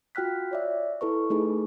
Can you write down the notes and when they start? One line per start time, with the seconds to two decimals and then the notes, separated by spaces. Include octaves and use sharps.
0.15 F4 F#4 G5 F6 F#6 B6
0.51 C#5 D5 E5
1.01 E4 A4 B4 C#6
1.30 A3 D#4 G#4 B4